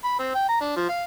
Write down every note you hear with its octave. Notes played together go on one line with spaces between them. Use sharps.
B5
C4
G5
A#5
D4
F3
F5